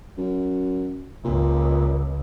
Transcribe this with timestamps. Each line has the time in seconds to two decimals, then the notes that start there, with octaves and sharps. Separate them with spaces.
0.18 F#2
1.24 C#2 A#2